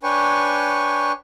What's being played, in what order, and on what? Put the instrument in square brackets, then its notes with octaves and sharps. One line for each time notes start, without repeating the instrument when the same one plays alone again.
[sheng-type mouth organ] D4 B4 C#5 G5 G#5 C#6